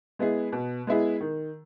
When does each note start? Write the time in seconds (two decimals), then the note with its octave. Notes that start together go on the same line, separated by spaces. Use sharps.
0.19 G#3 B3 E4 G#4
0.53 B2
0.87 G#3 B3 E4 G#4
1.21 D#3